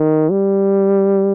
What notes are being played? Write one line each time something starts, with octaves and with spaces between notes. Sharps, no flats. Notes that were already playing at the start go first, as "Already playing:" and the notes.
Already playing: D#3
G3